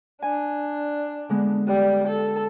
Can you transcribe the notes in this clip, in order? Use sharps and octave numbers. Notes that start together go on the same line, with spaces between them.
D4 G#5
D3 G#3 B3
G3
A4